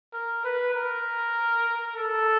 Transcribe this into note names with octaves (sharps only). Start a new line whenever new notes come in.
A#4
B4
A#4
A4